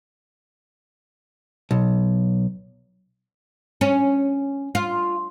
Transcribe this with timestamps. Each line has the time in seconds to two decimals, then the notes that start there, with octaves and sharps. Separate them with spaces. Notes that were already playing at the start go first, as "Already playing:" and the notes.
1.71 B1
3.81 C#4
4.75 F4